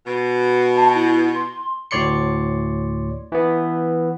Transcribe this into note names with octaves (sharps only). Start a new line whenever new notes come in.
B2
A5
E4
C6
D2 A2 C#5 D5 C6 C#7
E3 B3